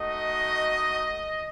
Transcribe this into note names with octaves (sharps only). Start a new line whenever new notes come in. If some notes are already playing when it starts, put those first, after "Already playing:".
Already playing: A3 D#4 F#4 D#5